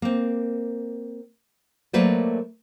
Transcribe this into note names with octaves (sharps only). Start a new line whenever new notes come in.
A#3 C4
F#3 A3 A#3 B4 C5 D5